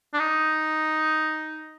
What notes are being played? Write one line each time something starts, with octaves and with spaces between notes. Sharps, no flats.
D4
D#4